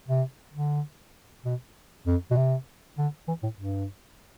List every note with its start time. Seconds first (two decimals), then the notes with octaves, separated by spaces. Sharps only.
0.08 C3
0.53 D3
1.45 B2
2.07 F2
2.31 B2
2.36 C3
2.98 D3
3.28 E3
3.43 A2
3.58 G2